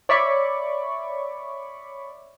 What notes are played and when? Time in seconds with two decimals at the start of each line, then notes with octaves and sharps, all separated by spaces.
0.09 C#5 D5 E5 B5 C#6 D6